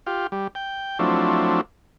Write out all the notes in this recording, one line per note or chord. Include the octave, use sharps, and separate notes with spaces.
F4 G4
G3
G5
F3 F#3 A3 C4 D4 E4